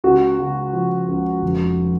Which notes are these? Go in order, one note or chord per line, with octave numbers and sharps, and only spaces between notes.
C#2 F#4
C#3
F3
C#2
F1